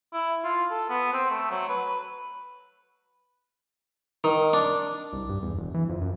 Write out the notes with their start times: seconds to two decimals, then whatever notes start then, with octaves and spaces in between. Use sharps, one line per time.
0.13 E4
0.44 F4
0.71 A4
0.90 B3
1.13 C4
1.30 A3
1.50 F#3
1.69 B4
4.24 D#3
4.53 D4
5.13 C2
5.29 G2
5.42 E2
5.57 E1
5.74 E3
5.89 F2
6.01 F#2